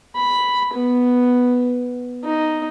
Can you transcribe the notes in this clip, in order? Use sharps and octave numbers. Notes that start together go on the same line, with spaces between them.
B5
B3
D#4